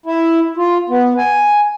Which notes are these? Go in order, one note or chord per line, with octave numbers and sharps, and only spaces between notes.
E4
F4
B3
G#5